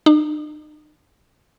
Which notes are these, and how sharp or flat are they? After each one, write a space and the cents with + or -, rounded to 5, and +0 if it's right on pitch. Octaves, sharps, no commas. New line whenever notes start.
D#4 -45